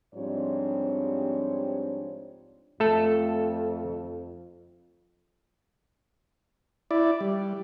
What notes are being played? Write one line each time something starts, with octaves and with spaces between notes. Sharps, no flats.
G#2 F3 G3 C4 D4 C#5
F2 A3 A4
E4 D5
G3